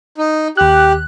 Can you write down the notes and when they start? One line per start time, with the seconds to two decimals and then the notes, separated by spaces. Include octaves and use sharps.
0.18 D#4
0.57 D#2 G4 F#6